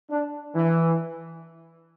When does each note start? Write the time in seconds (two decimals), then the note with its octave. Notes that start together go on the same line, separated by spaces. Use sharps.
0.11 D4
0.55 E3